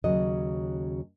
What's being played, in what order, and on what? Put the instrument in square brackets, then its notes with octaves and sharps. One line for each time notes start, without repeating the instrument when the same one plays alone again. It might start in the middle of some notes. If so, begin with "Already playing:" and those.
[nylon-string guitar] D#2 C#3 F#3 D#5